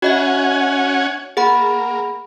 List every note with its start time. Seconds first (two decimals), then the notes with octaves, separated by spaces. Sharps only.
0.02 C#4 F#4 D#5 E5 F#5 G#5
1.37 A#3 G#4 F#5 B5